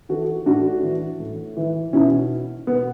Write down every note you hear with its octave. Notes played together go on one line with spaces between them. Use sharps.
E3 F#4 A4
A2 D4 F#4
E3
A2
E3
B2 C#4 E4
B2 B3